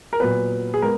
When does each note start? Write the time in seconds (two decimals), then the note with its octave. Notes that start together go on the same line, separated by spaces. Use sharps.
0.13 A#4
0.20 A#2 F#3 B3 B4
0.74 G#4
0.82 G#3 B3 A#4